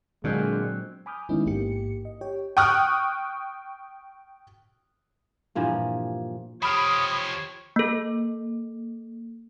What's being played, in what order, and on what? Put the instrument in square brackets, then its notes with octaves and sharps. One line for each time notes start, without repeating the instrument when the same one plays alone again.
[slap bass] A#2 [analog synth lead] D3 [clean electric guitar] F#3 C4 [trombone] G#3
[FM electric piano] G#5 B5 D6 D#6 F6 G6
D#3 G#3 B3 C#4 D#4 E4
A1 G#2 A#3 G4 C#7
D#5
G4 C#5 G5
[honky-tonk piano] G5 C#6 D#6 F6 F#6
[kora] G2 A#2 E3 F3
[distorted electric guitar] F3 G4 [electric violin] C#5 [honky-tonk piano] B5 F6 [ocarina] D#6
[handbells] A#3 A4